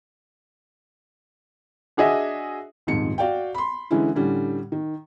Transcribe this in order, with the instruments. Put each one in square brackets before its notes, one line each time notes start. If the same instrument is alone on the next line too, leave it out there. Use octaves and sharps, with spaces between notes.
[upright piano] D4 F#4 G#4 D#5 E5
[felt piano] D#1 F2 G#2 C#7
F#4 D5 F5 G5
B5 C6
D3 E3 G#3 C#4 E4
A2 D3 G3 C#4
D#3